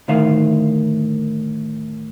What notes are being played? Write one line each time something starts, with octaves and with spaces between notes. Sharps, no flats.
D2 A2 D#3 F5